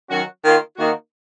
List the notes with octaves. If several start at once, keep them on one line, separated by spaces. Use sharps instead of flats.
D#3 F#3 C#4 F#4
D#3 A#3 F4
D#3 A#3 D#4 F#4